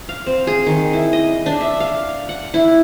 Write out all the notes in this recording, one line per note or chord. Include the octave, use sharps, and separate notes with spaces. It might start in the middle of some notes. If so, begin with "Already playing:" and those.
F5
C4
G#4
D#3
E4
D#5
D4
E5
F5
F#5
E4